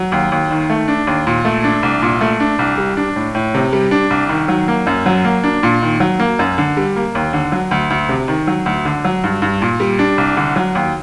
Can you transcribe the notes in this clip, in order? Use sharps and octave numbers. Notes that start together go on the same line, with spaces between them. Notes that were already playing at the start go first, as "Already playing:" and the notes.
Already playing: F#3
D#2
D#2
D#3
A3
D4
D#2
A#2
A3
D4
C2
A#2
A3
D4
C2
G3
D4
A2
A2
C3
G3
D4
C2
D#3
F#3
A#3
F#2
F#3
A#3
D4
A#2
D#3
F#3
A#3
F#2
D3
G3
A#3
D#2
D3
F#3
D2
D2
C3
D#3
F#3
D2
D3
F#3
G2
G2
A#2
G3
D4
C2
D3
F#3
D#2